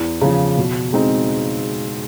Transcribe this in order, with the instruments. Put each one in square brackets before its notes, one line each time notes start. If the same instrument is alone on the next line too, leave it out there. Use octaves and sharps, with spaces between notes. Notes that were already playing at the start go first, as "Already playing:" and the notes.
Already playing: [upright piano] E2
C#3 F3
B2
G#3 C4 D#4